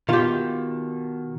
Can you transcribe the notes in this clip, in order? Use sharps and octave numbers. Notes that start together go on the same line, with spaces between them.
B2 D#3 F4 G4